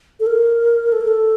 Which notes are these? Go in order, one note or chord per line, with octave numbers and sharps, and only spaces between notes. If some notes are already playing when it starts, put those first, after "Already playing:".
A4
A#4
A4
A#4
A4